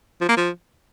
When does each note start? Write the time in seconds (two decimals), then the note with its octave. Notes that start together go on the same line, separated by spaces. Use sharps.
0.21 F3
0.29 A#3
0.37 F3